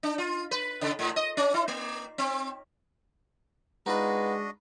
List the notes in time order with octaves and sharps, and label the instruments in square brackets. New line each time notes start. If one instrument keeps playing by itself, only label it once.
[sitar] D4
F4
B4
C#3
A2
D#5
C#4
E4
A#3
C4
[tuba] G#3 [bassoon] B3 [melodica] D4 F#4 D#5 [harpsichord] D#4 F4 B4